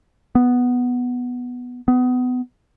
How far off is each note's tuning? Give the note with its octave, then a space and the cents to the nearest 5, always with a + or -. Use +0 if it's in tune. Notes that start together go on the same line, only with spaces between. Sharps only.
B3 +0
B3 +25